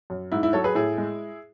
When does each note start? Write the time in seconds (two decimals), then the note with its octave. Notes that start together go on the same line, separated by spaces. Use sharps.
0.10 F#2
0.32 G#2 E4
0.43 E4
0.53 F#3 A4 C#5
0.64 G#4 B4
0.75 A2 E4 G#4
0.98 G#3